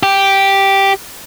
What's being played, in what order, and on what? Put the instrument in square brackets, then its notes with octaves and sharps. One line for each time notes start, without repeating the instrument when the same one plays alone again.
[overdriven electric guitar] G4